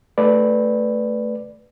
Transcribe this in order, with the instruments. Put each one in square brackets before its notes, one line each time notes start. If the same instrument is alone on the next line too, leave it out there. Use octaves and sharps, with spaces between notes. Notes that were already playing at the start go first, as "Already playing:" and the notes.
[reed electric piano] A3 B4 D5